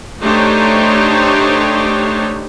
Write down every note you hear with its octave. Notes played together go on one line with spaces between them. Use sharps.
A3 D4 D#4 G4 C5 C#5